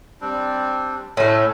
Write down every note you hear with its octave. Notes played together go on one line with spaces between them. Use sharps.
G3 C4 D4
A2 A3 C#4